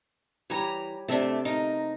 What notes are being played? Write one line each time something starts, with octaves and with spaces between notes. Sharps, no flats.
E3 G3 C#5 A#5
C3 A3 D4 A4
D#4 A#4